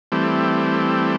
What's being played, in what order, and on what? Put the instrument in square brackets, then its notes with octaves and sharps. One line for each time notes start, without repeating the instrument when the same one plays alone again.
[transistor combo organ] E3 G3 A3 C4